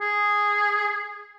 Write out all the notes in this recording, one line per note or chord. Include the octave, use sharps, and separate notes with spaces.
G#4